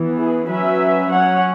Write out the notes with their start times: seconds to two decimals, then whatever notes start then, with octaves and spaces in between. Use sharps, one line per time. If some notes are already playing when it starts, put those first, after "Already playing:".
Already playing: E3 B3
0.17 E4 G#4
0.48 F#3 C#4 B4 E5
1.11 F#3 C#4 C#5 F#5